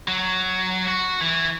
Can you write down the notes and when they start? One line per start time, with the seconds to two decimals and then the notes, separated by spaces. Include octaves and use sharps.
0.08 F#3
0.88 F#4
1.21 E3